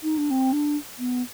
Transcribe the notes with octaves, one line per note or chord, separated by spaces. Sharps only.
D#4
D4
C4
D4
B3